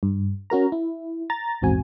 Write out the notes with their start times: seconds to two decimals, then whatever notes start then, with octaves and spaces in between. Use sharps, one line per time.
0.03 G2
0.50 C#4 F#4 A#4 A#5
0.72 E4
1.30 A#5 A6
1.61 A#1 E2 G#2 C4 F#4 G#5